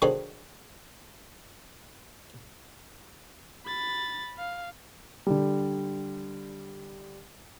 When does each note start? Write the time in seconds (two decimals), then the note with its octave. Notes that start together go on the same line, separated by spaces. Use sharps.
0.02 D3 D#3 F#3 G#4 C5 B5
3.66 B5 A6
4.38 F5
5.27 D3 G3